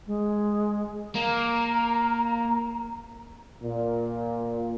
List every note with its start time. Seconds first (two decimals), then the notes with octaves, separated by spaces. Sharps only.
0.07 G#3
1.15 A#3 A#5
3.63 A#2